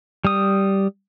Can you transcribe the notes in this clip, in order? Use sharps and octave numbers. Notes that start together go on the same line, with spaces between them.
G3 D#6